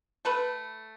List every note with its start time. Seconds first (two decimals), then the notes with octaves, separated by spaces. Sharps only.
0.25 A3 A4 B4